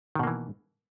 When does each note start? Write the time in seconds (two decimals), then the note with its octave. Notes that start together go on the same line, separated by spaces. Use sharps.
0.15 D#3
0.19 B2
0.23 A#3
0.27 E3